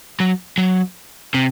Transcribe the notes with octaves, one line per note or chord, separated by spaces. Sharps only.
F#3
F#3
C3